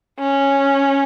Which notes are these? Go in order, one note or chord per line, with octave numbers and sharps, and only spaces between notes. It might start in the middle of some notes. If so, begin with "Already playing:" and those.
C#4